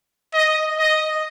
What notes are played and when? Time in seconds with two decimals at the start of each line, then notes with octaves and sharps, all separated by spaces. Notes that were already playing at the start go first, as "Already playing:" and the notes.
0.34 D#5
0.79 D#5